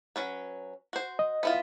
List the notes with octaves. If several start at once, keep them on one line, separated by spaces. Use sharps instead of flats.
F#3 C#4 B4
F#4 C5
D#5
B3 E4 F4